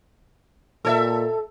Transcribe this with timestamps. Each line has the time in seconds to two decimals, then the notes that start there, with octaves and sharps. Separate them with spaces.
0.85 A#2 A4 C#5 E5